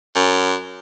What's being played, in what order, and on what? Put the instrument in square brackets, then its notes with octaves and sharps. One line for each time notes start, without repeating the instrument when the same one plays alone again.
[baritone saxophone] F#2